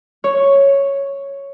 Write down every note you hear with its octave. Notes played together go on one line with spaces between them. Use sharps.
C#5